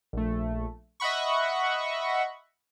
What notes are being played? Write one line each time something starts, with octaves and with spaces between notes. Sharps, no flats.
A#1 A3
D#5 E5 F#5 B5 C#6